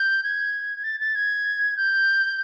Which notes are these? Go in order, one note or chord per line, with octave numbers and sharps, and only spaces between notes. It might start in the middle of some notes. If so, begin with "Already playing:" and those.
Already playing: G6
G#6
A6
A6
G#6
G6